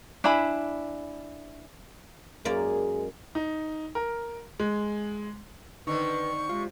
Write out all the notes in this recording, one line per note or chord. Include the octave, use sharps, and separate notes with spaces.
D4 E4 G#5 B5
F#2 G#3 A#3 G#4 D5
D#4
A#4
G#3
D3 D#3 C4 D#4 B4 C#6
C3 G#3 F4